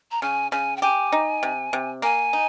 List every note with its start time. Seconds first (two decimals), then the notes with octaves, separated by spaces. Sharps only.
0.12 A#5
0.22 C#3 G#5
0.52 C#3 G#5
0.77 G5
0.82 G4 G#5
1.12 D#4
1.43 C3
1.73 C3
2.02 A#3 G#5
2.33 D#4